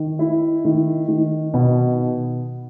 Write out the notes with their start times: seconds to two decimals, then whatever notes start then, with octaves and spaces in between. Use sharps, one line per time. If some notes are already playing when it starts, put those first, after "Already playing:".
Already playing: D#3
0.19 E4
0.65 D#3
1.09 D#3
1.54 B2